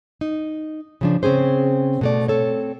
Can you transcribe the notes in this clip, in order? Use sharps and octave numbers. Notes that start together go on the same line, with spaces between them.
D#4
C#3 F3 D4
C#3 C4 C#4 G#4 C5
B2 A3 D5
C4 A4 C#5